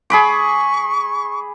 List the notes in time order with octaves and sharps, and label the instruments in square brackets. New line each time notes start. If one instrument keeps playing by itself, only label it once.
[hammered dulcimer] G#4 B5 D6 [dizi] C#6